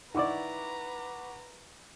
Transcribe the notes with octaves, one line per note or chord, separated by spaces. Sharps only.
D#3 E4 B4 D5 F#5 A#5 C#6 D6